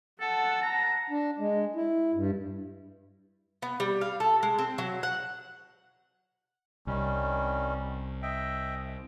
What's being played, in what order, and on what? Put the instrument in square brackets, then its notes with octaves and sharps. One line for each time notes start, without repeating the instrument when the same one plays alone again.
[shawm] A4 [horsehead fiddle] F#5 A5
[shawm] A#5
[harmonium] D4
G#3
E4
G2
[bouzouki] B3
G3
F5
A4
G#3
C4
F#3
F#5
[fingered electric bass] C2 [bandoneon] D#3 G3 C#4
[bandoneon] D#5 E5 G5